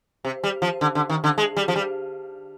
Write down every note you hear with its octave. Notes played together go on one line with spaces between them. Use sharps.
C3
G3
F3
D3
D3
D#3
D3
G#3
G3
F3
G3